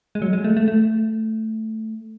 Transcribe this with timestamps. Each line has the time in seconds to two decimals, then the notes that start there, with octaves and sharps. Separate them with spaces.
0.15 G#3
0.22 F#3
0.33 G#3
0.44 A3
0.57 A3
0.68 A3